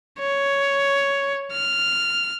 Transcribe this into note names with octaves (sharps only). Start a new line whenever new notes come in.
C#5
F6